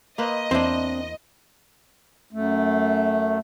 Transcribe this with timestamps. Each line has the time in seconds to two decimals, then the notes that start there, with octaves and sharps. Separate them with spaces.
0.18 A#3 B4 C5 D#5
0.51 E2 C4 D4 E4 C5
2.33 F#2 A3